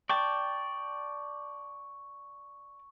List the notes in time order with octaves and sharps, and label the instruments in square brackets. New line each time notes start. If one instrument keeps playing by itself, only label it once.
[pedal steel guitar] D5 G5 A5 [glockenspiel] C#6